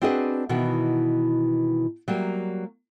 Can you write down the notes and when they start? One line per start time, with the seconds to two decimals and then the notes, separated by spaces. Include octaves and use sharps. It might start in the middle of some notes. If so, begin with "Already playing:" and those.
0.02 C4 D4 F#4 G#4 B4 D#5
0.49 B2 D#3 E3 F#4
2.08 F#3 G3 A#3